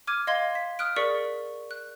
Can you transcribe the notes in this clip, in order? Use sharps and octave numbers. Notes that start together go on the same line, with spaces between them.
D6 F6 G#6 D#7
D#5 F5 C6 G#6 G7
B6
D#6 F6 F#6 D7
G#4 A#4 D5 C#6 B6 C#7
F#6